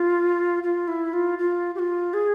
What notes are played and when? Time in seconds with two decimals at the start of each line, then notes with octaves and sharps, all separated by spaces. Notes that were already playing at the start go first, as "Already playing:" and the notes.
Already playing: F4
0.63 F4
0.88 E4
1.13 F4
1.38 F4
1.75 G4
1.79 F4
2.13 G#4